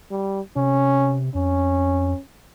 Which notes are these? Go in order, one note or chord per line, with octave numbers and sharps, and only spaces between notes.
G3
C3 C#4
F2 C#4